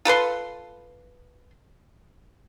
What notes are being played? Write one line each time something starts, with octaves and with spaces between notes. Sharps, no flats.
F4 A4 B4 C6